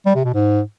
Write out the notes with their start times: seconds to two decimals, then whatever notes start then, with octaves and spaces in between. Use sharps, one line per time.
0.06 G3
0.15 C3
0.24 B2
0.34 G#2